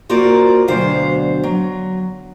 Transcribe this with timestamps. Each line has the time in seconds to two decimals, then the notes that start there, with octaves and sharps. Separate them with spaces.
0.09 A#3 F4 F#4 A#4 C5 D5
0.68 D2 B2 F#3 D4 C5 F5
1.44 F#3